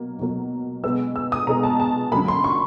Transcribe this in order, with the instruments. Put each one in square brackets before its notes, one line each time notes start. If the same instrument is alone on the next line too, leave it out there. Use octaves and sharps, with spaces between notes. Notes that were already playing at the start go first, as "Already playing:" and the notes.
Already playing: [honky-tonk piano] B2 F#3 A#3
B2 F#3 A#3
B2 G#3 B3 E6
E6
D#6
B2 G#3 B3 A#5
A5
A5
F#2 D3 F#3 A#3 B5
C6
C#6